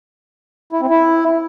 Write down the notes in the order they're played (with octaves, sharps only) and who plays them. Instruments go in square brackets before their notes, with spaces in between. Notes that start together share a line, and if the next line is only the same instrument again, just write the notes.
[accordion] E4
C4
E4